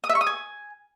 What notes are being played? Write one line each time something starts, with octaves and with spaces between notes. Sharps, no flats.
D#6
E5
C#6
D#6
G#5